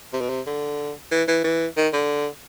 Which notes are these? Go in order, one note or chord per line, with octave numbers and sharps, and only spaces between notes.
C3
B2
C3
D3
E3
E3
E3
D#3
D3